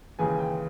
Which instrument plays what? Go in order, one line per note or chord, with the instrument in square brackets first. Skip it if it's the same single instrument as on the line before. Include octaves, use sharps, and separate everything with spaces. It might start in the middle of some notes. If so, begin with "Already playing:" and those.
[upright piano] D#2 C#3 E3 G#3 G#5
G5